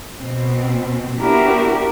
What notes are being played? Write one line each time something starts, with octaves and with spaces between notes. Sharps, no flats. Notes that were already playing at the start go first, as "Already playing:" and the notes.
B2 C4
B3 D4 E4 F#4 G4 A#4